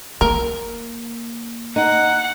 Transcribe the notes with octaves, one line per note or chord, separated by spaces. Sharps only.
A#3 A#4
D#4 F#5